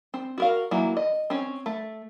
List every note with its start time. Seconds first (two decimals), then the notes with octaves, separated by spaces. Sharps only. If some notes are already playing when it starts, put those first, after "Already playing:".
0.14 C4
0.38 F#4 A#4 F5
0.71 E3 F#3 A#3 E4
0.97 D#5
1.30 C4 C#4
1.66 A3